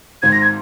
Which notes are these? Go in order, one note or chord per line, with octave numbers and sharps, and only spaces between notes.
G#1 G#2 D#3 G#6
A#6
G#6